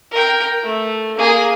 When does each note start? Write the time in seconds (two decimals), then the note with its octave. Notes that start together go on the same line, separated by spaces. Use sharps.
0.11 A#4 G5
0.63 A3
1.16 A#3 G#4